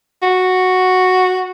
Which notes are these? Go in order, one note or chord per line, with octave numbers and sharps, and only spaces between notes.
F#4